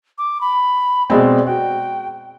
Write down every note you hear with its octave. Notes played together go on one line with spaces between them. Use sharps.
D6
B5
B2 G#3 C4 D5
F#4 G5